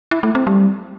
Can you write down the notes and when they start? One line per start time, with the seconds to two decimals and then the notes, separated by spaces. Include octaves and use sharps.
0.11 E4
0.23 A3
0.35 C4
0.47 G3